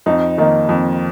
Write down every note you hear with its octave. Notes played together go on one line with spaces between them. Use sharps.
F2 D#4
D#3 A#3 D#4
F2